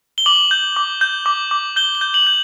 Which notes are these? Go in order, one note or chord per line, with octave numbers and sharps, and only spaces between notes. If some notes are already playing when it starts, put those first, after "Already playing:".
G7
D6 F#7
G6
D6
G6
D6
D6
G6 G7
G7
G6
F#7
G6